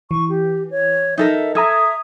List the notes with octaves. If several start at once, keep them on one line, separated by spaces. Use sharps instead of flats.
E3 C#6
G4
C#5
D#4 A4 A#4 E5
A4 E5 A#5 D#6 G#6